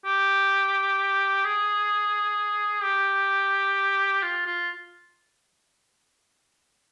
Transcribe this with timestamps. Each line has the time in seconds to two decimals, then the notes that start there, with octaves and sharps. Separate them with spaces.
0.05 G4
1.45 G#4
2.83 G4
4.23 F4
4.46 F4